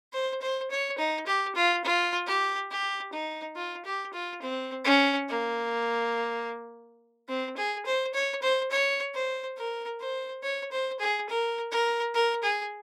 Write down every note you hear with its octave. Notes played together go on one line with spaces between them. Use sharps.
C5
C5
C#5
D#4
G4
F4
F4
G4
G4
D#4
F4
G4
F4
C4
C#4
A#3
C4
G#4
C5
C#5
C5
C#5
C5
A#4
C5
C#5
C5
G#4
A#4
A#4
A#4
G#4